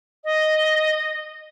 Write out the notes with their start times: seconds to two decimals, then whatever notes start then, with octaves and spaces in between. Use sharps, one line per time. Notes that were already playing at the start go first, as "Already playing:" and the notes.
0.24 D#5